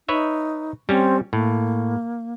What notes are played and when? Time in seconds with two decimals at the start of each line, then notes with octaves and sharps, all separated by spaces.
0.09 D#4 B4 C#5 E5
0.89 G3 C4 C#4
1.33 A2 A#3